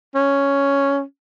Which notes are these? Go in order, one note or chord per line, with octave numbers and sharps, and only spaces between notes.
C#4